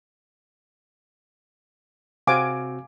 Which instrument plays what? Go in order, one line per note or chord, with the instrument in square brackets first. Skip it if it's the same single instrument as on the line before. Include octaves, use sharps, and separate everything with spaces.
[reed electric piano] C3 C4 F#4 [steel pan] F5 G#5 D6